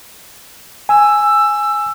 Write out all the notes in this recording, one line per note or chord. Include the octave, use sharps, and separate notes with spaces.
G#5 E6